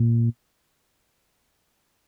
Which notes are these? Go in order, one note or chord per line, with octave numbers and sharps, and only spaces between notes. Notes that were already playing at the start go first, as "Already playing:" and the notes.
Already playing: A#2